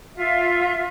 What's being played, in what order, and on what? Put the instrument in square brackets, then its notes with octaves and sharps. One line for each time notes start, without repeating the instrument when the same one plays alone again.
[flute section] F4 E5